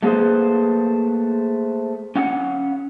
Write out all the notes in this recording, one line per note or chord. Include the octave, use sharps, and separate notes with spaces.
A3 A#3 G#4 B4 C5
C#4 F5 F#5